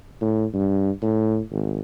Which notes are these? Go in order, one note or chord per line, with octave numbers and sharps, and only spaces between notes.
A2
G2
A2
G#1